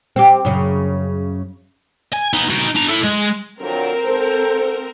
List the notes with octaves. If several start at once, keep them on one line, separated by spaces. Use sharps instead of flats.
C4 G4
F#2 C#3
G#5
B3 D#4
D#4 F#4
D4 A#5
E4 A4
G#3
F2 D3 F#3 C4 A#4
G#2 A4 C5